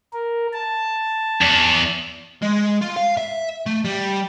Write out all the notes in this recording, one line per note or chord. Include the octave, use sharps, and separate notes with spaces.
A#4
A5
E2
G#3
F4
F5
E5
A3
G3